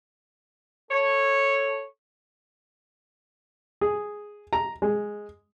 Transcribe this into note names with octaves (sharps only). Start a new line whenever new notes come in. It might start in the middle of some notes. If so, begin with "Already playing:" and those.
A4 C#5
G#4
A#5
G#3